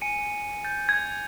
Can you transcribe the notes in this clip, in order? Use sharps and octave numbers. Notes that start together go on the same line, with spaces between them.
G#5 C#7 D#7
G6 A6
G#6